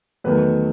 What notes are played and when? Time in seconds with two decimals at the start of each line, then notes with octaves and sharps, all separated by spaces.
0.24 E2 D#3 F#3 A3 B4